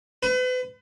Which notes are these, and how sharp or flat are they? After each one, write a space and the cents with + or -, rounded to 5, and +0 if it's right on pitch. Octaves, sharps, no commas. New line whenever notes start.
B4 +40